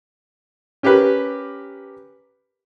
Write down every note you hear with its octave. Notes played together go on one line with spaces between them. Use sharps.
C#4 G4 A#4 B4